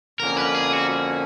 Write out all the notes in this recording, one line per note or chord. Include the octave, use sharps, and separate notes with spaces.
F2 D3 F3 A#3 C#4 A#4
B4
G#4
F#4